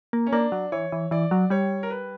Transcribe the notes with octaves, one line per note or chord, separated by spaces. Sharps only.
A#3
C#4
A#3 D4
F#3
E3 C#5
E3
E3 D5
F#3
G3 C#5
A#4
B4